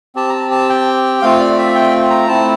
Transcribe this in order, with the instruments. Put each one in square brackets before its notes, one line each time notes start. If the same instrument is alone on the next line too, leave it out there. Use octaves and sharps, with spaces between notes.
[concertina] C4 G4 A5
A#5
A5
A5
G5
A3 C4 F4 F5
D5
E5
G5
A#5
A3 C4 E4 A5